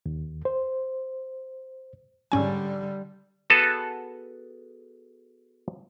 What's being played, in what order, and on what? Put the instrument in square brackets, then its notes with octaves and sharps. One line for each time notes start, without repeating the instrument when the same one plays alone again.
[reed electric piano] D#2
C5
[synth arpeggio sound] G#2 C#4 G#5 [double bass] D3 G3
[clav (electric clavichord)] B3 F#4 G#4 A4 B4 A5